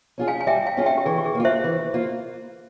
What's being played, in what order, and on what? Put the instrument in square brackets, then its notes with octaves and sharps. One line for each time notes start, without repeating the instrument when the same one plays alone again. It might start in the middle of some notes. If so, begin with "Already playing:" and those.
[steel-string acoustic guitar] C#4 F4 G#4
[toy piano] F5 G#5
G#5
[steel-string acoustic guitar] G3 [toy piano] E5 G5
[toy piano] F5 G#5
[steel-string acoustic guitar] C#4 F4 G#4
[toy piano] E5 G5
G4
[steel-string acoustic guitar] E3 [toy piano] G#4
[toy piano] G4
G#4
[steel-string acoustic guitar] A#3 F4
[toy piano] C5 E5
[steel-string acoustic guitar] E3
A#3 F4